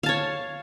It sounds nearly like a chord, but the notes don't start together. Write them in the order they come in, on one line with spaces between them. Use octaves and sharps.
F5 A5 C#5